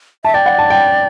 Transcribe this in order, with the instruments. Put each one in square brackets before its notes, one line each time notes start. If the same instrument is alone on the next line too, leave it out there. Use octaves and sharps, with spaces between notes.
[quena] E5 [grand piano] A5
[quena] D5 [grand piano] G5
[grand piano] F#5
A5
G5